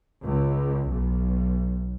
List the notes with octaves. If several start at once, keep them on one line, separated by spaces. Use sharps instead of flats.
C#2
B1